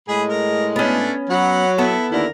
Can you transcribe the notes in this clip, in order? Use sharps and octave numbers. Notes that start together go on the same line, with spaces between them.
A2 G#3 G#4 B5
A#4
A3 B3 C#4 D4
F#3 F#5 B5
B3 E4 A4
D#2 D3 E4 A#4